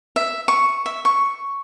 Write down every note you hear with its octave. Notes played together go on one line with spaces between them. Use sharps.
E5
C#6
E5
C#6